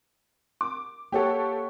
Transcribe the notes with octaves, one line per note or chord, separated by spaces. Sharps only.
D6
A#3 G4 A4 C#5 F#5